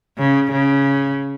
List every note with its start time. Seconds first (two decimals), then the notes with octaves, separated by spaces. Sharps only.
0.18 C#3
0.52 C#3